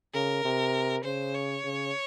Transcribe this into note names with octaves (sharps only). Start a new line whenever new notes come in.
C#3 A#4
C3
C#3 C5
C#5
C#3